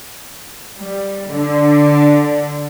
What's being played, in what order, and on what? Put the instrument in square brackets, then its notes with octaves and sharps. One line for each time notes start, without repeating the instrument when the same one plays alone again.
[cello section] G3
D3